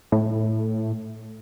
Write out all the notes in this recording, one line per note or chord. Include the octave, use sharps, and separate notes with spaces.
A2